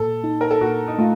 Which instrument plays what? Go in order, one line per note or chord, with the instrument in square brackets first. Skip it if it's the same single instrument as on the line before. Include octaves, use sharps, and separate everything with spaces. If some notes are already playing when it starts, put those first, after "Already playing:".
Already playing: [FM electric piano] A#2 [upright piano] A4
[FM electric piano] D#4
[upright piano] A#4
A4
[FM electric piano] A#2 [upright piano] F#4
[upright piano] D#4
[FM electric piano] A3 [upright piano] F4